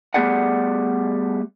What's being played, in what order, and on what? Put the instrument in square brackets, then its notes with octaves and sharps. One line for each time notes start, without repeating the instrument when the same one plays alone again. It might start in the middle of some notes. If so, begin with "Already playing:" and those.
[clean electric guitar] G3 A3 B3 G#4 D5 F#5